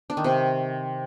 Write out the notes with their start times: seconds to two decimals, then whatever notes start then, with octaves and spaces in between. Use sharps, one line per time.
0.10 D4
0.17 D#3
0.24 C3